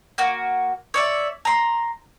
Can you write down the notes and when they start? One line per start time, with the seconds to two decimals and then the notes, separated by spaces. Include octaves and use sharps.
0.18 A#3 F#4
0.94 C#5 D5 E5
1.45 A#5 C6